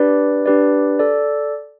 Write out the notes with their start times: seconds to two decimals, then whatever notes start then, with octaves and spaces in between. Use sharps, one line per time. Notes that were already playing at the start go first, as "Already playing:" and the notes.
Already playing: D4 G4 B4 D5
0.46 D4 G4 B4 D5
0.99 A4 D5